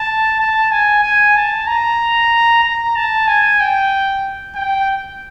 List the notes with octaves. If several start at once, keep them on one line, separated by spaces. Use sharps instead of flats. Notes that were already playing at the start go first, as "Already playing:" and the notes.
Already playing: A5
A5
G#5
G#5
A5
A#5
A#5
A5
G#5
G5
G5